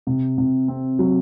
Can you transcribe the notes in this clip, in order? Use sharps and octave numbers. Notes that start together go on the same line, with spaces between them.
C3
C3
C4
F#3